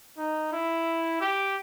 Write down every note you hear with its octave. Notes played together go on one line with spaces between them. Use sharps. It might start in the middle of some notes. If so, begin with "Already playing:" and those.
D#4
E4
G4